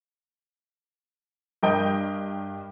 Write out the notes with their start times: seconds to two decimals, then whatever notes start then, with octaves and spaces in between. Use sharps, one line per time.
1.63 G2 A#4 D#5 G5 G6